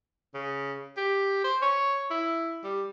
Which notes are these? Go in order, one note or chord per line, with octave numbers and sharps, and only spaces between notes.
C#3
G4
C5
C#5
E4
G3